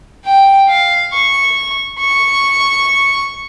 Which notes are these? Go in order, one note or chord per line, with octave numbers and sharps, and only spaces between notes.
G5
F5
C#6
C#6